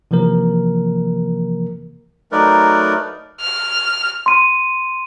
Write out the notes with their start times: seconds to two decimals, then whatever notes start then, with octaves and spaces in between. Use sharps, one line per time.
0.11 C3 E3 F3 A#3 A#4
2.32 F#3 A3 D#4 A#4 B4 D5
3.40 F6
4.26 C6 D#7